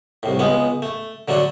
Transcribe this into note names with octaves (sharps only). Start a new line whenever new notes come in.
C2 A2
C#2 G#3 B3
A3
D3 F#3 A3 D4